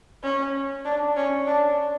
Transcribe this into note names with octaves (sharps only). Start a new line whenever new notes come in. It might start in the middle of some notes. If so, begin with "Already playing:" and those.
C#4
D4
C#4
D4